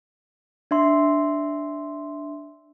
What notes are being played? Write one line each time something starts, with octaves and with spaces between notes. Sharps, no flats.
D4 E5 C6